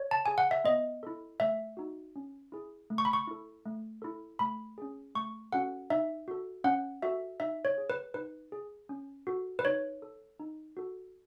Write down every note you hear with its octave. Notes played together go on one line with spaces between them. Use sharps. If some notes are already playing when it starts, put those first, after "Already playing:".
Already playing: C#5
A5
G#4 G#5
F#5
E5
B3 D#5
E4 A4
A3 E5
D#4 F#4
C#4
E4 G#4
A3
C#6
B5
C#6
E4 A4
A3
E4 A4
A3 B5
C#4 G#4
A3 C#6
C#4 F#4 A4 F#5
D#4 E5
F#4 A4
C#4 F#5
F#4 A4 E5
D#4 E5
C#5
G#4
B4
D#4 B4
G#4
C#4
F#4 A4
B4
D#4 C#5
A4
D#4
F#4 A4